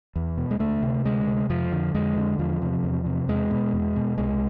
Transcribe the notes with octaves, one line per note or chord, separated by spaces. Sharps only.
E2
B2
G#3
D2 A3
C3
D2 G#3
C3
F2 F3
D3
F2 G#3
D3
E2 F3
C3
E2
C3
E2 G#3
B2
E2
B2
C2 G#3